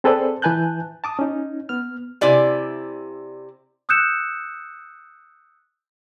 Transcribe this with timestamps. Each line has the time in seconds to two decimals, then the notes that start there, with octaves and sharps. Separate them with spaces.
0.04 C4 G#4 A4 B4 C5 D5
0.42 E3 B4 G#5 A5 F#6 G6
1.04 A5 D6 D#6
1.19 C#4 D#4
1.69 B3 F6
2.21 C3 E4 D5 G#5
3.89 D#6 E6 F#6 G6 C#7 E7